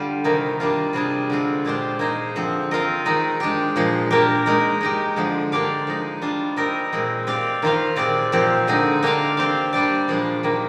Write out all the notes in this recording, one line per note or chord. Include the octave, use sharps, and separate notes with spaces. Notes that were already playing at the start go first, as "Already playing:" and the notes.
Already playing: D3 G3 F4
C3 D#3 A#3 D#4
G3 A#3 D4 F4
C3 G3 D4 G#4
D3 G#3 C4 F4
A#2 G#3 D4 G4 C5
A#3 D#4 G#4 C5 D#5
D3 F3 C4
C4 F4 A#4 D#5
D#3 G#3 D#4
G#3 D4 G4
A#2 F3 G#3
A#3 D4 G4 A#4
G#3 D#4 A#4
G#3 D#4 G4
D3 F3 G#3
A#3 D4 G4 D5 F5
F3 G#3 D#4
G3 D4 F4
C4 D#4 G4 A#4 D#5
A#2 G#3 C4
C4 G4 D5 F5
D#3 A#3 F4 C5 F5
A#2 G#3 C4 G4 D5
A#2 F3 C4 G4
D3 G#3 C4 D#4
A#3 D4 G4 D5 F5
C4 G4 C5 F5
G3 D4 G4 D5
A#2 F3 G#3 D4
D#3 G3 A#3